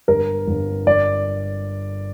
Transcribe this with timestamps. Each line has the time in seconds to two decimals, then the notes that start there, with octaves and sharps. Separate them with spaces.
0.08 G1 A#4
0.47 G1
0.86 G1 D5